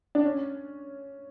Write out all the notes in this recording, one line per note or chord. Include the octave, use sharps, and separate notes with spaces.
D4
C#4